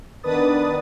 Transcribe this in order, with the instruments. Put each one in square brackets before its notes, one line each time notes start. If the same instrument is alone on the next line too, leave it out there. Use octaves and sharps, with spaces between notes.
[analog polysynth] D#3 B3 D4 B4 D#6 A6